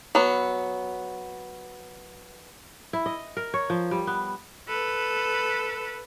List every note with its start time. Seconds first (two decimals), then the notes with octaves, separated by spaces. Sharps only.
0.15 F#3 B3
2.93 E4
3.06 D#5
3.37 A#4
3.54 C#5
3.70 F3
3.91 G3
4.07 B3
4.67 A4 B4